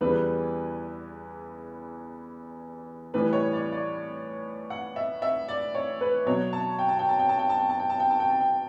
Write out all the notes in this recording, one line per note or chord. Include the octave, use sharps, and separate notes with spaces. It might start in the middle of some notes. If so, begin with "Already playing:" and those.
E2 C#3 E3 G3 B4
A2 E3 G3 B4
C#5
D5
D5
F#5
E5
E5
D5
C#5
B4
B2 F#3 C#5
A5
G5
A5
G5
A5
G5
A5
G5
A5
G5
A5
G5
A5
G5
A5
G5
A5
G5